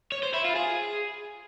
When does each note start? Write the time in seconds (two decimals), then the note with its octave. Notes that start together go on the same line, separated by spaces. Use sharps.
0.12 C#5
0.23 C5
0.34 E4
0.44 F4
0.55 G#4